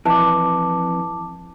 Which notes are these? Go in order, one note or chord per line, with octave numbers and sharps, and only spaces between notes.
F2 E3 A5 D6